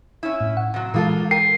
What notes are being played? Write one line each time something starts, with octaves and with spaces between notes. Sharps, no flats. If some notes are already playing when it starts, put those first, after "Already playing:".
C#4 E4
A2
F#5
C3 F#3
A#2 E3 G#3 A#3 F4 A4
A#4 G5 C7 D#7